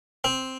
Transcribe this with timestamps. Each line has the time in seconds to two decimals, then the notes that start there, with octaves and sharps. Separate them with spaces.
0.24 C4